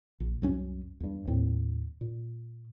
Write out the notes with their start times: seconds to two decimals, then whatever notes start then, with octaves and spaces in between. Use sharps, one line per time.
0.20 A#1
0.42 C2 F#2 C#4
1.00 E2 G2
1.27 D#2 A2 C4
2.01 A#2